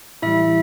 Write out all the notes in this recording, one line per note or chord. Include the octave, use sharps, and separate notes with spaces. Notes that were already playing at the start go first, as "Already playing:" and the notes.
A2 E3 G3 E4 E5